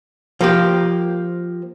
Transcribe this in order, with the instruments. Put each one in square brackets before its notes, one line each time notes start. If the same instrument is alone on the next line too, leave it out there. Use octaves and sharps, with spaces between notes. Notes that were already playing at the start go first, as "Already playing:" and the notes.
[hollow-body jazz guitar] F3 A#3 G4